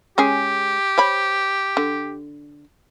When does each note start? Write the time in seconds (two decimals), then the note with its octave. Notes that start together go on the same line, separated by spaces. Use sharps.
0.18 G#3 C#4 G4 G#4
0.98 C5 C#5 B5
1.77 D3